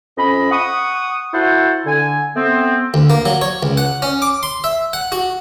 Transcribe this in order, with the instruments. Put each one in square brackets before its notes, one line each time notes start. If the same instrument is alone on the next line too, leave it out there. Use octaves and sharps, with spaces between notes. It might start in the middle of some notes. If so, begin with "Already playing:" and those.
[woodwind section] F2 C#4 D#5 B5
F#5 C#6 D#6
E4 F#4 A4 C5 F#5
D3 G#5
A3 B3 C4
[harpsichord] D2
A#3
F#3
C#5
C#2
F#5
C#4
D6
C6
E5
F#5
F#4